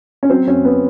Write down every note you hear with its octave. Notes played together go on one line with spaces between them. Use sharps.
C#4
F#3 C4
F#2 C#4
B3